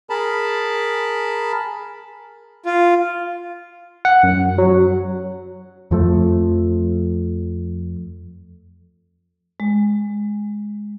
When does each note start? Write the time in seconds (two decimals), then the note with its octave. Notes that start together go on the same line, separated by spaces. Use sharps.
0.10 G#4 A#4 A5 B5
2.66 F4
4.05 F#5
4.23 F#2
4.58 F#3
5.91 F2 F3 A3
9.60 G#3